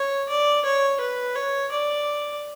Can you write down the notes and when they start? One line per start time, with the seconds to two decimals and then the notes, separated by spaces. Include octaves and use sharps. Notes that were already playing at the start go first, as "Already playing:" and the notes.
Already playing: C#5
0.29 D5
0.65 C#5
1.01 B4
1.36 C#5
1.71 D5